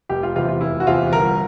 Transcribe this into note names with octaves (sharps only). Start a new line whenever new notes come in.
F1 G4
F4
E2 C3 F3 F4
F4
F1 E4
F#4
E2 C3 F3 F4
G1 A#4